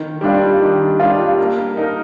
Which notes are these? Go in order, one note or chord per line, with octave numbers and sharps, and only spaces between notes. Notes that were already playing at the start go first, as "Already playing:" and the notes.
Already playing: D#3
G3 D4 F4
D#3
G3 D4 F4
A#3
D#4 A#4